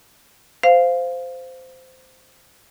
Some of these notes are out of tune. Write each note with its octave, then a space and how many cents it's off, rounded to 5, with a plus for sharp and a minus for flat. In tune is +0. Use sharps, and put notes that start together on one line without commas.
C5 -15 F5 +0